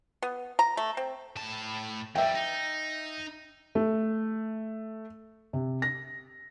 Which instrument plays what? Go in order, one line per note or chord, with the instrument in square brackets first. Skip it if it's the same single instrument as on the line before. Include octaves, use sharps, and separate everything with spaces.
[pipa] B3
A#5
A3
C4
[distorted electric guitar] A2 A5
[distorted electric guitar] F2 G3 [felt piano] E5 G5
[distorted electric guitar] D#4
[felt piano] A3
C3
A#6